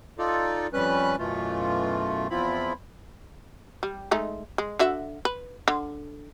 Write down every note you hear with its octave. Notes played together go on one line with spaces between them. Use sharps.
D#4 F4 A4 D5
F2 G3 C#4 B4 F#6
F#2 B2 E3 A3 F4
E2 F3 C4 E4 F4 B5
G3
G#3 A3 D#4
G#3
D3 F#4 E5
B4
D3